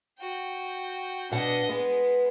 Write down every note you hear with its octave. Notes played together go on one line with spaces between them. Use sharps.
F#4 G5
B2 D4 D#5 F#5
G#3 B3